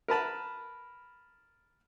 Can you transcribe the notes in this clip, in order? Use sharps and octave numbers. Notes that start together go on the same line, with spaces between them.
A#4 B4 A5 B5